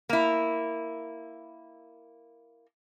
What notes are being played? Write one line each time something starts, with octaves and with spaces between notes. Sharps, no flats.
A#3 E4